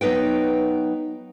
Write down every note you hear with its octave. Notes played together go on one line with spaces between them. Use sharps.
F#3 B3 D#4 B4 G5